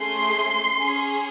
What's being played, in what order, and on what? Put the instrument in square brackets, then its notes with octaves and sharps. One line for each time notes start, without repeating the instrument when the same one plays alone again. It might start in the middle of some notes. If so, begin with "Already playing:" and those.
Already playing: [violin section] A3 C#4 G#4 C6
C#4 G#4